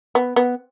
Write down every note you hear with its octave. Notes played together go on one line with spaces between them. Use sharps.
B3
B3